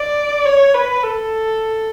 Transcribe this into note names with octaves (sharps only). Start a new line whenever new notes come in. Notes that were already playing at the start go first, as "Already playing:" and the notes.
Already playing: D5
C#5
B4
A4